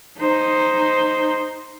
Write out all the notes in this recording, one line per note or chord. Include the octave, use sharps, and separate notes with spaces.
D#4 C5